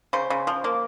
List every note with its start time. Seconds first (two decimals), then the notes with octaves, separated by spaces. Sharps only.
0.13 C#3 C5
0.30 C#3
0.47 F3
0.64 A#3